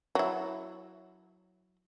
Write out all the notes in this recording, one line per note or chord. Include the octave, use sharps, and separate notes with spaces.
F#3 E4